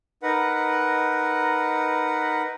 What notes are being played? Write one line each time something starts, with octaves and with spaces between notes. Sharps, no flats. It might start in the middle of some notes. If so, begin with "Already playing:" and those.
D#4 A#4 B4 F#5